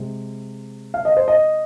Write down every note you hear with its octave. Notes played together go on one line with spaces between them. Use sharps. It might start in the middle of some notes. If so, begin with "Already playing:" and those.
Already playing: C3 G#3
F5
D#5
C5
D#5